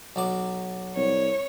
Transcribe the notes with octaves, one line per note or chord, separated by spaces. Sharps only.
B1 F#3 D6
C2 C#5